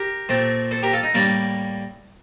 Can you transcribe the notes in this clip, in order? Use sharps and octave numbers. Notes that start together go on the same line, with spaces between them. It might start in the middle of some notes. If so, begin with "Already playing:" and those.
Already playing: G4 A#4
A#2 A3 C4
A4 C5
G4 A#4
F4 A4
D#4
A2 G3 A#3 D4